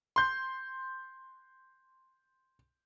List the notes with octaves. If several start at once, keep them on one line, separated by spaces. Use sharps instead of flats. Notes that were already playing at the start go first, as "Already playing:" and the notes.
C6 G6